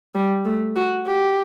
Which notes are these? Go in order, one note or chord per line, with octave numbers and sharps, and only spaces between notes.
G3
A3
F#4
G4